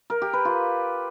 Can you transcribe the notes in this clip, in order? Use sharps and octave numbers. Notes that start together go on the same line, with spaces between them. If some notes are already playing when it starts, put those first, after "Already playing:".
A#4
G4
B4
F4